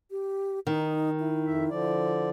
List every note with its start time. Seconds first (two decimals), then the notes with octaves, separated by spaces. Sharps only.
0.11 G4
0.67 D#3 D#4
1.20 E4
1.46 F2 E5
1.70 D3 F3 D5